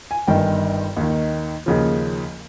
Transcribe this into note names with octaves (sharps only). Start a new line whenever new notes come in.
G#5
G1 G2 D#3 G5
D#2 D#3
D#2 C#3 F3